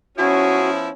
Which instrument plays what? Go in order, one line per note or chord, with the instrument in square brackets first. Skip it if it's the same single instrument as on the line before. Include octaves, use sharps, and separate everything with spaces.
[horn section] F3 B3 E4 [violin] C#4 [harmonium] F#4 [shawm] G#4